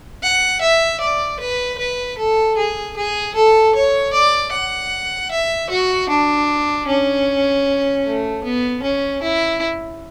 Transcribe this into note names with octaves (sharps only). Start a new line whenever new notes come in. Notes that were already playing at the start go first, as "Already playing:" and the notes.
F#5
E5
D5
B4
B4
A4
G#4
G#4
A4
C#5
D5
F#5
E5
F#4
D4
C#4
A3
B3
C#4
E4